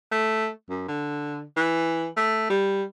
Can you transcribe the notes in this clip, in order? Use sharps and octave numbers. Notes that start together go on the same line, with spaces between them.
A3
F#2
D3
E3
A3
G3